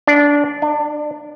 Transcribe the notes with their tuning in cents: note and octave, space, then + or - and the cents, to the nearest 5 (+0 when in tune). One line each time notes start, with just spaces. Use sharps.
D4 -15
D4 +30